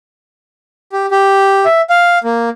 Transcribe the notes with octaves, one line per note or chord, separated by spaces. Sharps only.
G4
G4
E5
F5
A#3